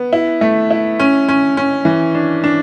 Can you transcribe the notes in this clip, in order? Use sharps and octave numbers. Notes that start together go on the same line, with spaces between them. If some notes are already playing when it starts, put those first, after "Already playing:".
Already playing: B3
E4
A3
E4
C#4
C#4
C#4
E3
D4
D4